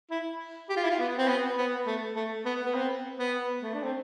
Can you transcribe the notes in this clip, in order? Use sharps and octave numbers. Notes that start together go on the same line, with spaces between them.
E4
G4
F4
E4
F4
B3
C4
B3
B3
A3
A3
B3
B3
C4
B3
A3
D4
C4